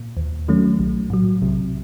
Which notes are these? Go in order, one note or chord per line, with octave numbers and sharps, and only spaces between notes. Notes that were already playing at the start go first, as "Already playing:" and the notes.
Already playing: A#2
D#2
D#3 F#3 A3 C#4
B1
A2 F#3
B1 C3